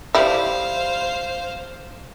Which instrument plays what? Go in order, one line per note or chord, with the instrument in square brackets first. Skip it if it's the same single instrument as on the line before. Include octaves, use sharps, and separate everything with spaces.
[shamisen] G3 E4 [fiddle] C5 F5